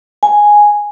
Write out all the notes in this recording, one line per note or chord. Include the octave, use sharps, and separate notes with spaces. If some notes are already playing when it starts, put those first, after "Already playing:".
G#5